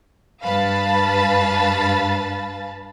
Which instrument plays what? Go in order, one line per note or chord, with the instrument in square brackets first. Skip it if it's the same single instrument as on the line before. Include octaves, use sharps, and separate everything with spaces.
[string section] G2 B4 F5 A5 B5 A6